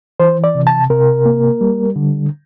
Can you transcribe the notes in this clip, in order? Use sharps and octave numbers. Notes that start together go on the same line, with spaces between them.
E3 C5
D5
C3
A5
C3 A#4
A#3
G3
D3